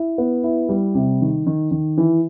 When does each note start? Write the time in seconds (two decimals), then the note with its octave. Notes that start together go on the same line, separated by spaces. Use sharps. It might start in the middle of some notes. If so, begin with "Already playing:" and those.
Already playing: E4
0.18 B3
0.44 E4
0.69 G3
0.95 C3
1.21 D#3
1.47 D#3
1.71 D#3
1.97 E3